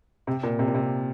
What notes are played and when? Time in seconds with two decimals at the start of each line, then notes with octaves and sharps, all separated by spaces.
0.27 C3
0.43 A#2
0.59 C3
0.68 A#2
0.74 C3